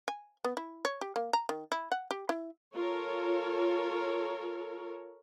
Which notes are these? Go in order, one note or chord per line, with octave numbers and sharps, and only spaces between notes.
G#5
B3
E4
C#5
G4
A#3
A#5
D#3
E4
F#5
G4
E4
F4 A4 A#4 C#5